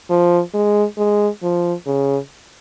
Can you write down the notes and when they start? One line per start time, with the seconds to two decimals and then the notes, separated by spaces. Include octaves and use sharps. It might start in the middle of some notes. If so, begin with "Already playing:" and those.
0.10 F3
0.54 G#3
0.97 G#3
1.43 F3
1.87 C#3